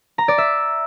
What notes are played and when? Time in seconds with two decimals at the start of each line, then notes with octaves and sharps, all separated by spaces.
0.18 A#5
0.28 D5
0.38 E5